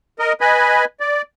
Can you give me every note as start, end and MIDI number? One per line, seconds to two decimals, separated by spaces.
0.19 0.33 70
0.19 0.33 75
0.41 0.85 71
0.41 0.85 75
0.41 0.85 80
0.41 0.85 83
1.00 1.22 74